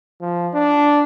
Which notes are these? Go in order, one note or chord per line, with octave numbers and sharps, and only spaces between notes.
F3
D4